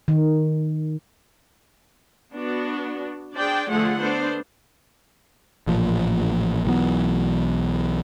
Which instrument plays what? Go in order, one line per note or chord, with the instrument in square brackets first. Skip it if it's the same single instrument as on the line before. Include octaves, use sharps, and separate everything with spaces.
[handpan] D#3
[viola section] B3 D4 F#4
D4 G#4 C5 D5 G5
D3 F3 A3 F4 G#4 F#5
A3 B3 D4 C5
[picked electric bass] A1 A#2 F3
B1 E3 F#3 B3